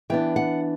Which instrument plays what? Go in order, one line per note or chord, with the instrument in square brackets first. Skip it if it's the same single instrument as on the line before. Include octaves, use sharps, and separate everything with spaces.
[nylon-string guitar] E3 B3 D4 G5
F#5